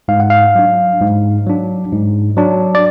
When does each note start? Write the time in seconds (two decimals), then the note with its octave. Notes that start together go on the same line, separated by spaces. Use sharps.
0.08 G#2 F5
0.20 F#5
0.30 F5
0.55 F#3 D4
1.01 G#2
1.47 F#3 D4
1.92 G#2
2.37 F#3 D4
2.75 D5